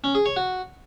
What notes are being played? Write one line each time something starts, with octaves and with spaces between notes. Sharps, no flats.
C#4
G#4
C#5
F#4